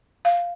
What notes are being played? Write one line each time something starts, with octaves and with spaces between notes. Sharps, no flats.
F5